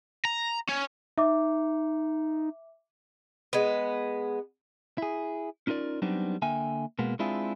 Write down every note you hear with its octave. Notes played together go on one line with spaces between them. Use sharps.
A#5
C#4
D#4 E5 D6
G#3 B3
E4 G#4
C#4 D#4 F4 A#4 D5
F#3 G3 B3 C4 D4 D#4
D3 A#3 E5 G5 G#5
B2 G#3 A#3 B3
G#3 C4 D4 E4 F4 G#4